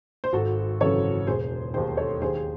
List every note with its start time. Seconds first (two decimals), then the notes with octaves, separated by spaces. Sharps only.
0.24 C5
0.33 G#1 F#4 A4
0.81 F#2 C#3 E3 A4 C#5
1.27 E1 G#4 C5
1.74 D#3 G#4 C5
1.78 D#2
1.97 A4 C#5
2.21 D#2 G#4 C5
2.35 G#4